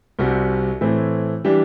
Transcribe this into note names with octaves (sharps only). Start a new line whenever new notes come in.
C2 C3 G3 C4 F#4
A2 E3 A3 C4
E3 G3 D4 G4